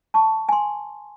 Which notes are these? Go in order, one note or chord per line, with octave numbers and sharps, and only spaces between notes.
A5 C#6
G#5 C6